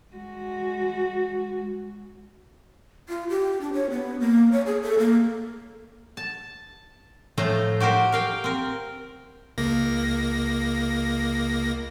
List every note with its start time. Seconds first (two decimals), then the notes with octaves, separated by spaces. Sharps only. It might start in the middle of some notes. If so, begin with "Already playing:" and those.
0.14 G#3 F#4
3.09 F4
3.29 G4
3.61 D4
3.73 C#5
3.90 B3
4.20 A#3
4.52 C#5
4.66 G#4
4.82 A4
4.99 A#3
6.17 A5
7.38 A2 F3 A3 C5 A#5
7.80 F#4 G4 A#4 C5
8.12 A#4 F5 G5
8.44 C4 A#4
9.58 C#2 A#3 A#6